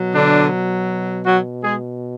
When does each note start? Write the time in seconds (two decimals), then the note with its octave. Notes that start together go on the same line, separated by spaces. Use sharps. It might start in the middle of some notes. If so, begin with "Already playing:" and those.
Already playing: B2 F#3
0.15 D3 D4
1.26 F#3 F#4
1.63 G#3 G#4